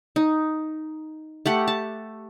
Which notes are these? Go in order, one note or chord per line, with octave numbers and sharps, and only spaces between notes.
D#4
A3 G4 F#5
A5